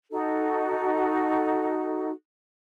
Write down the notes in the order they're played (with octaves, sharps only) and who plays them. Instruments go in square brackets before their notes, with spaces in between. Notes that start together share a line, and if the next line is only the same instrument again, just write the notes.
[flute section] D#4 F#4 A4